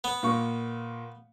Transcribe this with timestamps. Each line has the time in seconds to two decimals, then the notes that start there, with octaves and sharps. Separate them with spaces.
0.04 B3
0.23 A#2 A#3 C#6